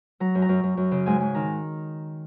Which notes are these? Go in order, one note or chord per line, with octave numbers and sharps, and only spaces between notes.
F#3 A#5
F#2
A#5
F#2
F#2
F#2
C#3
G#2 G#5
G#2 G#5
D#3 A#5